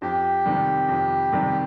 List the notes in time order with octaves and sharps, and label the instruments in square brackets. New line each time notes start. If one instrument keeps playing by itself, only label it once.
[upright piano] F2 [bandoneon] G4
[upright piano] C3 D#3 G3
F2
C3 D#3 G3